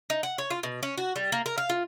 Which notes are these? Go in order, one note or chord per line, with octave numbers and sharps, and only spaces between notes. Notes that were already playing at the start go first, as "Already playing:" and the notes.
D#4
F#5
C#5
F4
B2
C#4
F#4
G3
A#3
A#4
F5
F4